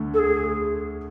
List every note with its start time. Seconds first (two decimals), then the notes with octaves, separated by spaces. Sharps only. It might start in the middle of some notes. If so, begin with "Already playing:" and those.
Already playing: D2 D3 A3
0.13 A4
0.18 G#4